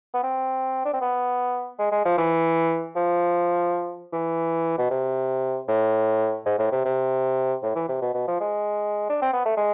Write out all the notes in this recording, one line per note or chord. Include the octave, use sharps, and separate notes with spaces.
B3
C4
D4
C4
B3
G#3
G#3
F3
E3
F3
E3
B2
C3
A2
G#2
A2
C3
C3
A2
E3
C3
B2
B2
F3
G#3
D4
C4
B3
A3
G#3